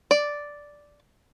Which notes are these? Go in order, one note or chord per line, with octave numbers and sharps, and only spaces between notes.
D5